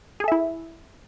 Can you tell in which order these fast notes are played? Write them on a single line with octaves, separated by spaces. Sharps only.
G#4 A4 E5 E4